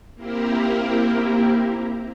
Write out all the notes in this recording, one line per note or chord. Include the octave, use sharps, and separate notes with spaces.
A#3 C4 E4 G4 A#4